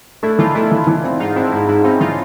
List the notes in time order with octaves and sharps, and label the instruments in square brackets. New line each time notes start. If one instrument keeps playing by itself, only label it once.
[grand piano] A3 [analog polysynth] D4 E4
[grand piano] E3 [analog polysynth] D#4 F4
[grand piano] A3 [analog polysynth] D4 E4
[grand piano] E3
E3
C4
[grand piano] G#2 [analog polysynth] D#4 F4
[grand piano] C4 [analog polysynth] D4 E4
[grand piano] G#2 [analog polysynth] D4 E4
[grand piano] G#2 [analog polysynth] D4 E4
[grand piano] C4 [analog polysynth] C#4 D#4
[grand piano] E3 [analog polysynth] D#4 F4